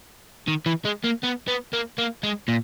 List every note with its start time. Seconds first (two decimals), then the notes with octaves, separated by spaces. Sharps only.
0.48 D#3
0.66 E3
0.85 G#3
1.04 A#3
1.23 B3
1.48 B3
1.73 A#3
1.98 A#3
2.23 G#3
2.48 A#2